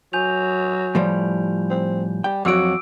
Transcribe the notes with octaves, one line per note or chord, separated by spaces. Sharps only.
F#3 G#5 G6 F7
A2 F3 G3
C4
G3 G5
F2 F#3 F#4 D6 E6 D7